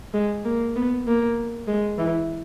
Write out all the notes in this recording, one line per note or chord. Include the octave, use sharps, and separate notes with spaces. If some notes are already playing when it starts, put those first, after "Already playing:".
G#3
A#3
B3
A#3
G#3
E3